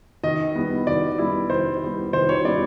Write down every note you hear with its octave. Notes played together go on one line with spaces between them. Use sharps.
D#3 D#5
G3 B3 E4
D#3 D5
G3 B3 E4
D#3 C5
G3 B3 E4
D#3 C5
C#5
G3 B3 E4 D5